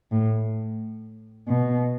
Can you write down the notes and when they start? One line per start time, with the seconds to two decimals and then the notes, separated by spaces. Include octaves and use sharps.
0.11 A2
1.48 B2